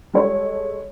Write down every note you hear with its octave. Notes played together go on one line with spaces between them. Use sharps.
G3 G#3 A4 C#5